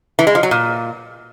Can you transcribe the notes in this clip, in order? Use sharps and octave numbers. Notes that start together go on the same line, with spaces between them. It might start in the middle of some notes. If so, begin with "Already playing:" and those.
E3
G#3
F3
F#3
A#2